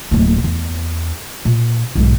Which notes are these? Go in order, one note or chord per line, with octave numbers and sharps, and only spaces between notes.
D1 A#3
E2
A#2
B1 G#2